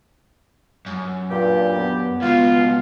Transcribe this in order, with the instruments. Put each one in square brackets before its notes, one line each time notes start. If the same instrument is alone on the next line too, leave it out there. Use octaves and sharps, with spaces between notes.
[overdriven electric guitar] F#2
[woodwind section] G2 G4 [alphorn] A#2
[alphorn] B3
[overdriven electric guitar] C#2 B2 [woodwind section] F4